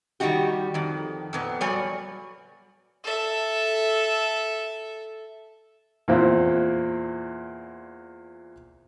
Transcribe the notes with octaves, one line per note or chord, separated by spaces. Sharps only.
D#3 G3 G#3 D#4 F#4 G4
F2 D#3
F2 A#2 B3
F#3 G3 C#5 D5 G#5
A4 E5
E2 A#2 C4